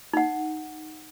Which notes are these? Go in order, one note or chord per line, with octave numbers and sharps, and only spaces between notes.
D#4 F#5